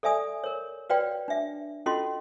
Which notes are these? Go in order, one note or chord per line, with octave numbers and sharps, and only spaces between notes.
A4 D5 E5 G#5 D#6
A#4 C#5
F#4 B4 C#5 D5 F5 G5
D4 E5
C#4 F4 F#4 A4 D#5 C6